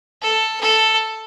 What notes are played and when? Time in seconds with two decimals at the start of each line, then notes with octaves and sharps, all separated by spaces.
0.22 A4
0.61 A4